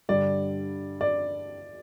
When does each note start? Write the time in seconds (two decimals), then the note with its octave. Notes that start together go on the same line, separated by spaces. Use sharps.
0.09 G2 D3 G3 D5
1.01 D5